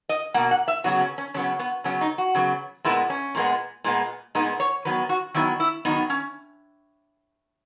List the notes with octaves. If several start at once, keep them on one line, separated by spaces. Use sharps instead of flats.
D#5
B2 A#3 F#5
F#5
E5
C#3 F#3 B3 F#4
C#4
C#4
C#3 F#3 B3 C#4
B3
C#3 F#3 B3 C#4
D#4
F#4
C#3 F#3 B3
A#2 G#3 B3 E4
C#4
A#2 G#3 B3
A#2 G#3 B3
A#2 G#3 B3 D#4
C#5
D#3 F#3 B3 B4
F#4
D#3 F#3 B3 E4
E4
D#3 F#3 B3 D#4
C#4